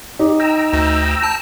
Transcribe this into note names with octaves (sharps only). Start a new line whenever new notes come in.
D#4 G4
G5 A#5 E6
D2
A5